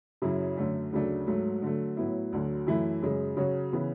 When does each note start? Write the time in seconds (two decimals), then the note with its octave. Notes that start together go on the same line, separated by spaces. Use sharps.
0.22 F#2 C#3 F#3 C#4 E4
0.56 F#2 D3 A3 C#4
0.93 D2 C#3 F#3 A3 D4
1.27 G#2 F#3 A3
1.62 D3 F#3 A3
1.97 A2 F#3 B3 E4
2.32 D2 D3 F#3
2.67 F#2 E3 A3 E4
3.02 F#2 C#3 G#3
3.37 C#3 F#3 C#4 F#4
3.72 C#3 E3 B3